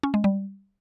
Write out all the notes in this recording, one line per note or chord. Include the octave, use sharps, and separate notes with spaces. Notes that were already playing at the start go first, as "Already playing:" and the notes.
C#4
G#3
G3